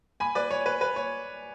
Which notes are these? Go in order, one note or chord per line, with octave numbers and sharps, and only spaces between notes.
G#5 B5
B4 D5
C#5
B4
B4
C#5